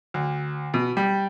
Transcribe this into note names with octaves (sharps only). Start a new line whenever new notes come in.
D2
B2
G3